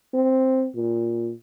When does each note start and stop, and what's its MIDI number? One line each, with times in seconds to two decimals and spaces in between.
0.13 0.67 60
0.75 1.32 46